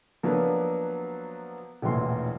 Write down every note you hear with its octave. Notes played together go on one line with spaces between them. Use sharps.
F3 F#3 A#3 B3 D4 B4
E1 A#1 A2 E3 F#3 C6